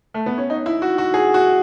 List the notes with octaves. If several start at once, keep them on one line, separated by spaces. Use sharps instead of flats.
A3
B3
C#4
D#4
E4
F#4
F#4
G#4
F#4